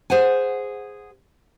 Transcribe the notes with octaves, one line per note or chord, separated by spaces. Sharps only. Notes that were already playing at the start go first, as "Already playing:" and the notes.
G#4 C5 F#5 G#5